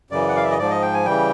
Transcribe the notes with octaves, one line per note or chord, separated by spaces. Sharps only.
F#2 C#3 E3 D5
F#5
F5
E5
D#5
G#2 F3 D5
D#5
G5
G#5
C#3 E3 G3 G5